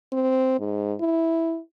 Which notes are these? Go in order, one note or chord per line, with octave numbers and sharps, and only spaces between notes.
C4
G#2
E4